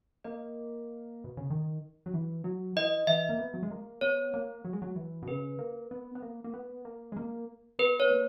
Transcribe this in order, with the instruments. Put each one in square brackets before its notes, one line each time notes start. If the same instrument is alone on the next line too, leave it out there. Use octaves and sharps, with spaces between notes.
[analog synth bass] A#3 [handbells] D#5
[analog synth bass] B2
C#3
D#3
F#3
E3
F#3
[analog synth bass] E3 [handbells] D#5
[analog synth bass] E3 [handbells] E5
[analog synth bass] A#3
B3
F#3
G#3
A#3
[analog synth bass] B3 [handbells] C#5
[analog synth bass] A#3
F#3
G#3
F#3
E3
B2
[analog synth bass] C#3 [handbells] B4
[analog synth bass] A#3
B3
B3
A#3
A#3
B3
A#3
G#3
A#3
[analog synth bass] B3 [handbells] B4
[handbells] C#5
[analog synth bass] A#3